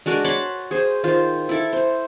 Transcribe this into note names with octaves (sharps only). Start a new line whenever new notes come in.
G#3 D4 F#4 A#4
C#5 A5 B5 C6
G#4 C5
D#3 F4 C5
E4 A4
C5